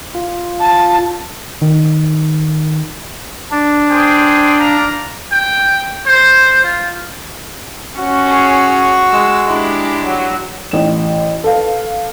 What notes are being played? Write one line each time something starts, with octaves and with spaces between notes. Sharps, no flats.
F4
A5
D#3
D4
G#4 C5 G5
D5 F5 A#5
G5
C5
F4
C#4 F#4
G#4 C#5
G#3 E6
G#3 D4 E4 G4
F#3
A1 E7
A4 B4 F5